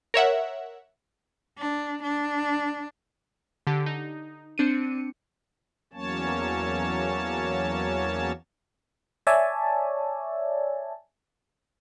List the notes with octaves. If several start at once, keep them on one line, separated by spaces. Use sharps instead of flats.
A#4 C#5 E5 F#5
D4
D4
D3 G4
D#4
C4 D4 C#7 D#7
E2 F#3 A#3 C#4 C#5 A5
C#5 D5 E5 G#5 A5